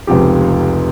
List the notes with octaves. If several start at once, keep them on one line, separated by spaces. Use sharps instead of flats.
F1 C#2 C3 F3 G4